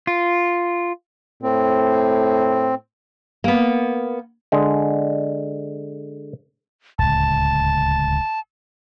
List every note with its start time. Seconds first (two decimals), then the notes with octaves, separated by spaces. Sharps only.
0.07 F4
1.43 A2 C4
3.44 A#3 B3
4.52 D3 G#3
6.99 D1 C#2 A5